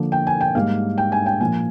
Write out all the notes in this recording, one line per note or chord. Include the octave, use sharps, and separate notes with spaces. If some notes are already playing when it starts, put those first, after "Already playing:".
Already playing: D3 F3 A#3
G5
G#5
G5
G#2 G3 A#3 F5
G5
G#5
G5
A#2 F3 A#3 G#5